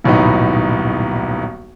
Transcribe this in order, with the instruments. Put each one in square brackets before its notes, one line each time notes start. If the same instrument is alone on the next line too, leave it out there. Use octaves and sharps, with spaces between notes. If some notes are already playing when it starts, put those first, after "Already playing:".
[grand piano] D#1 B1 A2 B3 D#4